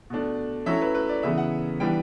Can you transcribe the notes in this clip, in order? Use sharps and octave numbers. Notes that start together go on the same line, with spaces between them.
B2 A3 D4
F#3 A3 C#4 E4 E5
B4
B4
D5
C#3 E3 B3 E5
F#5
E3 G3 B3 D4 G5